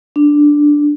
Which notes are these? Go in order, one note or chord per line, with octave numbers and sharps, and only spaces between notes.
D4